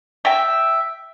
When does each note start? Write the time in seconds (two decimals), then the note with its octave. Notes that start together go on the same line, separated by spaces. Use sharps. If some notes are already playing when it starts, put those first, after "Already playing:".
0.25 E5 G5